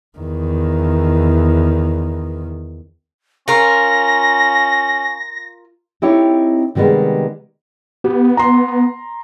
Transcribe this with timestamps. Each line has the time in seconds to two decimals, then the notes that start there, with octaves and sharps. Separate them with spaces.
0.18 E2 D#3
3.48 C#4 F4 A#4 A#6
6.02 C4 D#4 E4 G4 A4 C#5
6.75 C3 D#3 G3 G#3 B3
8.04 B3 G4
8.37 A#5 C6